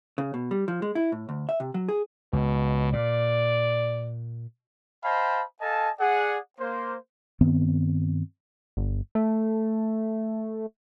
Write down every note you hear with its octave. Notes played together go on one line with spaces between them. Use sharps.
C#3
B2
G3
F3
G#3
E4
A2
D2
E5
C3
F#3
G#4
C#2 B2
A#2 D5
C5 D#5 F5 G5 A5 B5
A4 D#5 F5 G#5 A5
G#4 D5 F#5
A#3 C5
G2 D#3 B3 C4
G1
A3